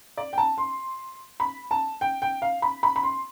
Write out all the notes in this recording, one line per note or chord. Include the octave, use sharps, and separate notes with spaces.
D5
G5
A5
C6
B5
A5
G5
G5
F5
B5
B5
B5
C6